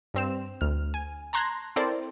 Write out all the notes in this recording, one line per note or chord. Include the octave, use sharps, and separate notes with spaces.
G2 C4 E7
D2 F6
G#5
A5 A#5 C6 F#6 G#6 A#6
C4 E4 A4 A#4 C5 D5